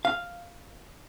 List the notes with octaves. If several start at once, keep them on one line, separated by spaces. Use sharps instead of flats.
F5